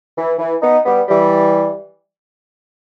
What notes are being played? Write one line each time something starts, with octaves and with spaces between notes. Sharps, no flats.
E3
E3
B3 D#4
G3 B3
E3 G3